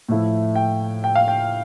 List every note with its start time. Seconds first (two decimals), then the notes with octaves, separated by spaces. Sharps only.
0.09 A2 F3 A3 E4
0.55 G5
1.04 G5
1.15 F5
1.28 G5